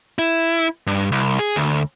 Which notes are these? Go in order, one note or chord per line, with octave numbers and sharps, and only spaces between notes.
E4
G2
C2
G#4
D2